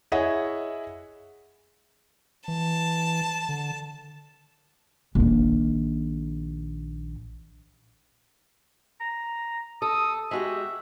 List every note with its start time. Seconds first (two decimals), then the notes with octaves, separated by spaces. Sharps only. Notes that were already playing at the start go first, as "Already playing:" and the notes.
0.12 E4 G#4 C#5 D#5 E5 F#5
2.48 E3 A5
3.49 D3
5.15 A#1 D#3
9.01 A#5
9.82 A4 D#6
10.31 G#3 F#4 G4 E5